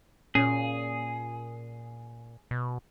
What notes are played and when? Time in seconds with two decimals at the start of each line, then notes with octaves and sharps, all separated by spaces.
0.35 A#2 C#4 G#4
2.51 B2